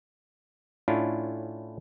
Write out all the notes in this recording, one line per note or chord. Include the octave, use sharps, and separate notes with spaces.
A2 C#4 D4 E4 F4